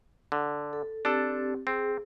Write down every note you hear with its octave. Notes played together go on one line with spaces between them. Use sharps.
D3
A4
C4 D4 G4 A4
C4 G#4